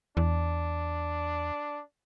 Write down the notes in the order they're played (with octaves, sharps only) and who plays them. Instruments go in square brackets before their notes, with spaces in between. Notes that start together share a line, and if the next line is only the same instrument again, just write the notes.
[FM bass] E2 [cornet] D4